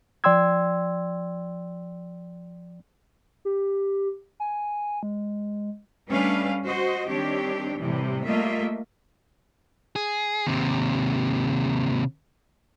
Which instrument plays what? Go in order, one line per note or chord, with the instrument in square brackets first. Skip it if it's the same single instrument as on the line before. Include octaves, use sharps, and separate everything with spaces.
[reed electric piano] F3 D5 G5 C6 E6 G#6
[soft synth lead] G4
G#5
G#3
[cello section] G3 A3 C#4 D4 B4 F5
F#4 C5 D#5
D#3 G3 C4 D4 G4 C#5
A2 C3 E3 G3
G3 A3 A#3 F4 D#5 E5
[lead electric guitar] G#4
D#2 C3